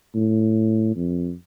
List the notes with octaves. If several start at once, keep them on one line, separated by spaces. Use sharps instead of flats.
A2
F2